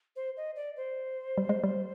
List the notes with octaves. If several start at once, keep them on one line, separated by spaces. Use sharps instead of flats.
C5
D#5
D5
C5
G3
G#3
G3